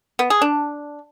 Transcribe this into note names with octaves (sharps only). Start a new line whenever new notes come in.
B3
G#4
D4